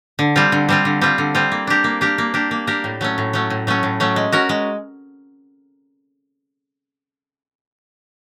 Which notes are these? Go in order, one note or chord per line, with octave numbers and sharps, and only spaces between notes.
D3
G3 C4 F4
D3
G3 C4 F4
D3
G3 C4 F4
D3
G3 C4 F4
A#3
D4 G4 A#4
A#3
D4 G4 A#4
A#3
D4 G4 A#4
A#3
D4 G4 A#4
A2
F#3 A3 C#4
A2
F#3 A3 C#4
A2
F#3 A3 C#4
A2
F#3 A3 C#4
G#3
C#4 F#4 A#4
G#3